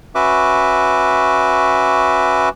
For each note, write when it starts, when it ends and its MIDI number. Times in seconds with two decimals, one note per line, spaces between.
0.15 2.49 61
0.15 2.49 66
0.15 2.49 71
0.15 2.49 76
0.15 2.49 86